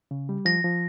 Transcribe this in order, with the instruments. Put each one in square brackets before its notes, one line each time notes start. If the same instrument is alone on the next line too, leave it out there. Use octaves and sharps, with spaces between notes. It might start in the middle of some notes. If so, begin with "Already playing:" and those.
[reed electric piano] C#3
G3
[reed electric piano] F3 [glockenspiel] A#6
[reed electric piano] F3